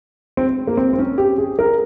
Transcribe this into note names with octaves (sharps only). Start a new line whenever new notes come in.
C4
A#3
C4
C4
C#4
G4
G#4
A#4